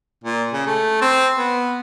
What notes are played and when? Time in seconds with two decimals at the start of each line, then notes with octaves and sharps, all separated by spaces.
0.24 A#2
0.53 C#3
0.67 A3
1.01 C4
1.36 B3